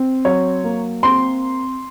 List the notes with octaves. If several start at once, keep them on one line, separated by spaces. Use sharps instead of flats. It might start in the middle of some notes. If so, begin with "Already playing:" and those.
Already playing: C4
F#3 C#5
A#3
C4 C6